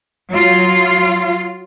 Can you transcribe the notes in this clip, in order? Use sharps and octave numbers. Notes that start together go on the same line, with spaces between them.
F#3 F4